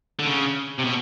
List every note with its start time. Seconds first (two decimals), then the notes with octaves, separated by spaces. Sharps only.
0.19 D3
0.27 C#3
0.78 C3
0.84 B2